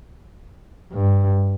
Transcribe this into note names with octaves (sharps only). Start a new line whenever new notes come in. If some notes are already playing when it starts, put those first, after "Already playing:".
G2